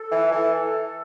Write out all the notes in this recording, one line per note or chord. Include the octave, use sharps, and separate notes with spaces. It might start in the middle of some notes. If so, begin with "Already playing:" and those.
Already playing: A4
E3
E3